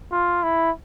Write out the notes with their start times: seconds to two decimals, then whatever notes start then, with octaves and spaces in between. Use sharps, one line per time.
0.12 F4
0.43 E4